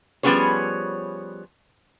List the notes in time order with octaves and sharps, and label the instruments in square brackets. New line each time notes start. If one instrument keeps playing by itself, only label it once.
[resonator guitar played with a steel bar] F3 G3 B3 C#4 G#4 C#5